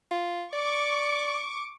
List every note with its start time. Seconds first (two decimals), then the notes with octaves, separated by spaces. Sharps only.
0.11 F4
0.53 D5 C#6 D6